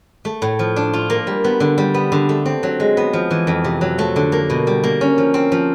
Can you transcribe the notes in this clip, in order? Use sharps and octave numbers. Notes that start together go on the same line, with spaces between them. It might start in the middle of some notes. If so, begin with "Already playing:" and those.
A3
A2
F3
D4
F4
A#3
G3
B3
D3
G3
B3
D3
A3
C4
F#3
G#3
B3
F3
E3
F2
C3
F#3
A3
D3
A#3
B2
G3
A#3
C#4
F3
C4
F3